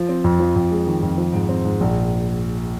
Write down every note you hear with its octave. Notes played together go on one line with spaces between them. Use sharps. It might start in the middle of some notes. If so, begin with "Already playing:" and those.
Already playing: F3
C4
F2
F3
F2
G#3
D#3
F2
F3
G#2
C4
G#2
A#1